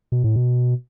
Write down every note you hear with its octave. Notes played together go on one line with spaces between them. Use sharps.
B2
A2
B2